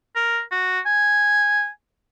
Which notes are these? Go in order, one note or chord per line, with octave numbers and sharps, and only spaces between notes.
A#4
F#4
G#5